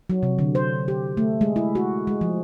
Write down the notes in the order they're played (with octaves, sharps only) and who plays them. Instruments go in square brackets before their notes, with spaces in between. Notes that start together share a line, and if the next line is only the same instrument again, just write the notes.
[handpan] F#3
C3
D3
C5
G4
A3
G#3
E4
F#4
G#3
F3